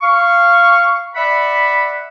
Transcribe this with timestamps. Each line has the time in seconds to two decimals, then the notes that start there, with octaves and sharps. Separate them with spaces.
0.02 F5 C#6
1.15 D5 E5 F#5 B5